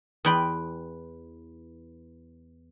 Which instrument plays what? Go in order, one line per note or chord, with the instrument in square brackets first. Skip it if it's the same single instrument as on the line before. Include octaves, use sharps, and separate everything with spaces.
[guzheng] E2 B4 G5 B5 C6